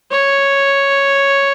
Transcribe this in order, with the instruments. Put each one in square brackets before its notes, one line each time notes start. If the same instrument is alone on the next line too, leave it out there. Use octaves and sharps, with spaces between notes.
[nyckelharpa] C#5